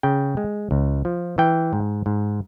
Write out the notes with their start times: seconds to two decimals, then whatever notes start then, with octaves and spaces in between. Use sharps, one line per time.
0.03 C#3 G5
0.37 G#3
0.71 C#2
1.05 F3
1.38 E3 G5
1.73 G#2
2.06 G#2